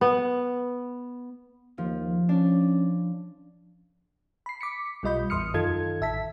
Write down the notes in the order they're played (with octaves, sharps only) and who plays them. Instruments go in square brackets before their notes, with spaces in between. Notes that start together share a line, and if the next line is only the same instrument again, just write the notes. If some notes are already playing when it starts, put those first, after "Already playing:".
[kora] B3
[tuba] D#2 [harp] F3
[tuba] C#4 [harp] D4
[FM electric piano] B5 C7
D6 B6 C#7
B1 G3 F4 D#5 B5 G6
A1 E2 C6 D#6 F6 C#7
F#2 D#3 D#4 F4 A4 G#6
A1 E5 A5 B6